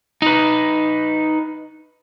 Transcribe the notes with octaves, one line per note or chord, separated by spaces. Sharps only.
D#4 B4